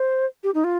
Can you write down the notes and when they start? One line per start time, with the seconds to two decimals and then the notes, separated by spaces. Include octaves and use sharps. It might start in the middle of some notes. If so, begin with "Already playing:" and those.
Already playing: C5
0.43 G4
0.54 D#4
0.64 F4